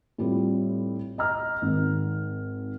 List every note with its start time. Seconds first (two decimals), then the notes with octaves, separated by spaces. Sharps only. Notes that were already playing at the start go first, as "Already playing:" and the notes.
0.18 A2 G3 C4 F4
1.18 D#5 A#5 F6
1.62 G#1